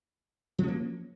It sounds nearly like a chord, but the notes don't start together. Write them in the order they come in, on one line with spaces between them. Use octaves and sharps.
F3 C#4 A#3